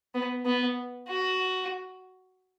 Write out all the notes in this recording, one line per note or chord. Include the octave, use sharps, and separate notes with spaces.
B3
B3
F#4